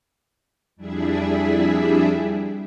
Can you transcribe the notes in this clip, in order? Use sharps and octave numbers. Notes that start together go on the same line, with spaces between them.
F2 G3 D4 E4 G#4 E5